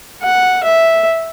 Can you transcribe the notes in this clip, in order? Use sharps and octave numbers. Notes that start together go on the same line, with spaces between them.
F#5
E5